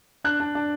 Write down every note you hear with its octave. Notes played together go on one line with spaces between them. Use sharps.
D4 F#6
D4
D4